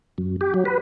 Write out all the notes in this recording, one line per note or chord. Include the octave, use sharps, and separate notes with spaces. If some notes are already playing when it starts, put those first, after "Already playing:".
F#2
G4
F#3
B4